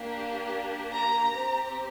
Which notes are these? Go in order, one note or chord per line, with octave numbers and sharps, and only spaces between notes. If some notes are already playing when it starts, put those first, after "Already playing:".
Already playing: A#3 D4 G4
A#5
C4 G4